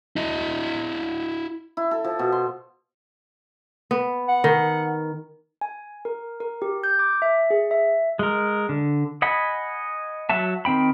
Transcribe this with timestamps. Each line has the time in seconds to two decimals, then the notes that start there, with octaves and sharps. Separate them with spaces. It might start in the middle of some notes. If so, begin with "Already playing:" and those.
0.16 E4 D#5
1.77 E4
1.91 A4
2.04 F3
2.19 B2
2.32 C6
3.91 B3
4.28 F#5
4.44 D#3
5.61 G#5
6.05 A#4
6.40 A#4
6.62 G4
6.84 G6
6.99 D6
7.22 E5
7.50 G#4
7.71 E5
8.19 G#3 A#4
8.69 D3
9.22 D#5 F#5 G#5 B5
10.30 F#3 F#4 E5 A5
10.65 D#3 C4 G5 B5